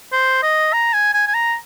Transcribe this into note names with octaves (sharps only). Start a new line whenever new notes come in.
C5
D#5
A#5
G#5
G#5
G#5
A#5